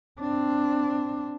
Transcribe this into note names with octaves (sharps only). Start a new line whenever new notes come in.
C4 D4